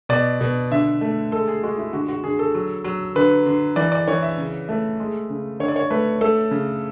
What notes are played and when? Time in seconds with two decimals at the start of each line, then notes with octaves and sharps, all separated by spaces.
0.09 B2 D5
0.41 B2
0.71 D3 E5
1.01 A3
1.32 G#3 A4
1.48 G#4
1.63 G#3 F#4
1.78 E4
1.93 D3 F#4
2.08 F#4
2.24 D3 G#4
2.39 A4
2.54 F#3
2.84 F#3
3.15 D3 B4
3.46 D3
3.76 E3 D5
3.92 D5
4.08 E3 C#5
4.22 E5
4.38 C#3
4.69 A3
4.99 G#3
5.30 C#3
5.60 D3 C#5
5.68 D5
5.76 C#5
5.90 A3 B4
6.21 A3 A4
6.51 C#3